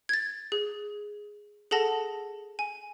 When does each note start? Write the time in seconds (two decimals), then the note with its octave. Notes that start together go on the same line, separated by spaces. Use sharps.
0.09 G#6 A6
0.52 G#4
1.71 G#4 A4 F#5 A5 A#6
2.59 G#5